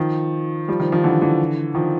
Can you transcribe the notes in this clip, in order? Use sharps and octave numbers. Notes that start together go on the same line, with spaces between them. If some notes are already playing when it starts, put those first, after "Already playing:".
Already playing: D#3 F3
F3 G3
D#3 F3
D#3 F3
D3 E3
D3 E3
D#3 F3